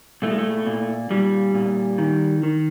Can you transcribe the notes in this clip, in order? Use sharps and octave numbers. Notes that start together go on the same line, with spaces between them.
A#2 A3
G#3
A3
A#2
A#2 G3
A#2
D#3
D#3